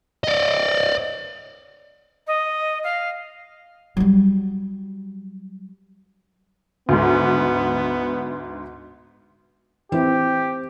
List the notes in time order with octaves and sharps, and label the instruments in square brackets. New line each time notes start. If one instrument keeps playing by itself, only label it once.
[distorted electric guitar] D5 D#5
[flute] D#5
F5
[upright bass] F#3 G3
[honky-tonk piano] D2 G#2 [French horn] B3
[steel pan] E3 E4 [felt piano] C4 [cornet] G4